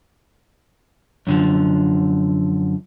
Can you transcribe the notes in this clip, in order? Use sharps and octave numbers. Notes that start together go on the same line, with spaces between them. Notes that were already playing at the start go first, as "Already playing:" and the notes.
F#2 D3 F3